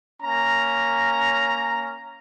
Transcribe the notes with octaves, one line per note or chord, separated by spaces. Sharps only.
A#3 C#4 A#5